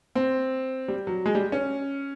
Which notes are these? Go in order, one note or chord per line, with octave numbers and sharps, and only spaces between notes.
C4
G3
F#3
G#3
G3
C#4